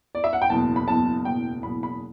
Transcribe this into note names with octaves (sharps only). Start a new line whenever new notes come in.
D5
E5
F#5
G5
F#1 E2 B2 A5
B5
F#1 E2 B2 A5
F#1 E2 B2 G5
F#1 E2 B2 B5
B5